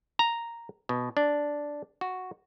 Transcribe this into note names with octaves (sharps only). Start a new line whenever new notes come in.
A#5
B2
D4
F#4